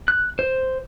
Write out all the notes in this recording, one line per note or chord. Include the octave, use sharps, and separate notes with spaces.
F#6
C5